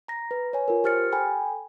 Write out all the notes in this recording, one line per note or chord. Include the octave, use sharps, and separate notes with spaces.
A#5 A#6
B4
C#5 G#5
F4 A#4
G4 C5 F6 A6 C#7
A4 G5 G#5 B5